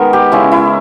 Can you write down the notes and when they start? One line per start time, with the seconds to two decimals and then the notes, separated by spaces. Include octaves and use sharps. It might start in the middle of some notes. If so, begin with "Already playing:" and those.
Already playing: D#3 G#3 B3 A#4
0.13 G4
0.32 C#3 G#3 C#4 E4
0.52 E4